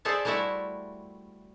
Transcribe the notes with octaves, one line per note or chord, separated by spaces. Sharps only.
G#4 A4 C5 D5 E5 A5
G3 A3 E4 F#4 E5